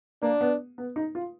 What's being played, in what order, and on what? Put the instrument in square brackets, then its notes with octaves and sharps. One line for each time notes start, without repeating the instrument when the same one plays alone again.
[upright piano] A#3 [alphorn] D4
[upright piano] B3
B3
D#4
F4